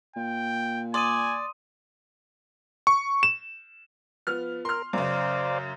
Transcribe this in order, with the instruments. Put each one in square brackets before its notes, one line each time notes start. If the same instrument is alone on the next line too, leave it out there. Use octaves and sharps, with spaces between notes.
[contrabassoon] A#2 [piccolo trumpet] G5
[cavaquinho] D5 [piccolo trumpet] G#5 [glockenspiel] C6 D#6 D#7
[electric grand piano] C#6
E7
[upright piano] F3 B3 F6
[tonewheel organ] A#4 [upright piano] C6 F6
[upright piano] F#2 C#3 [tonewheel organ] C5 D5 F5